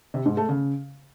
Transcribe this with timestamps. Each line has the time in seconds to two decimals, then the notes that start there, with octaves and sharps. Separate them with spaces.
0.14 C3
0.26 G#2
0.37 A3
0.49 C#3